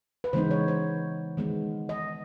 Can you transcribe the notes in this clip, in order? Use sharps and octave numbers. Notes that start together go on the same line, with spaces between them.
B4
C#3 E3 G#3 B3 D#4 C5
C#5
C5
D#3 G#3 B3
D#5